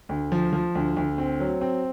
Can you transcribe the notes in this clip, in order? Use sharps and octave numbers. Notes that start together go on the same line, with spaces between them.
D2
F3
F3
D2
D2
C4
F#3
C4